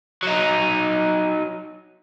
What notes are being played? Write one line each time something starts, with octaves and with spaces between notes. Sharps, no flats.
F#3 D#4